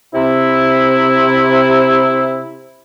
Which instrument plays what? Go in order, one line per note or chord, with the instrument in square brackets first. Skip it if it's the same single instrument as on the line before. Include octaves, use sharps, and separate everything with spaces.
[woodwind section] C3 E4